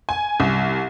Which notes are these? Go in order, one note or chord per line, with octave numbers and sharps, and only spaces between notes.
G#5
C2